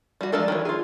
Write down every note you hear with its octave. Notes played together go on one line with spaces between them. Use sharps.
G3 F#4
F3 G#3 D4 A4 A#4
D#3 E3 C#5
F4 G#4